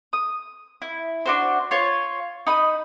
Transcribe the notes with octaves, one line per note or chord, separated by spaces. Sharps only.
D#6
E4
D4 F#4 C5
F4 C#5
D#4 B5 D#6